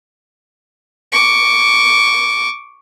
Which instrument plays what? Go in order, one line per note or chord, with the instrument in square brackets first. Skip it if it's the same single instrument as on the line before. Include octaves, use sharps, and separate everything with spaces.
[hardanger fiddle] C#6 D6